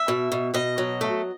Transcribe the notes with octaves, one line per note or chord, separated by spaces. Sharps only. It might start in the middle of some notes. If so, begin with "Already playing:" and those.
Already playing: E5
B2
B2
B2 D#5
F#3
A3